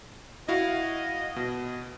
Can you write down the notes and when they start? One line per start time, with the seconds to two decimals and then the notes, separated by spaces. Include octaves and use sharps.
0.49 E4 F#4 D#5 F5
1.36 B2